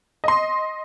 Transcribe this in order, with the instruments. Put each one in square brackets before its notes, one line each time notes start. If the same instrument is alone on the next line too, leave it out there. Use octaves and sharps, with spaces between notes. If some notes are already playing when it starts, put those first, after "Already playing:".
[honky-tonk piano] D#5 C6